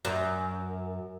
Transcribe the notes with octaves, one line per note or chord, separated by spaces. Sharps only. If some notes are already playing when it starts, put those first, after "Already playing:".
F#2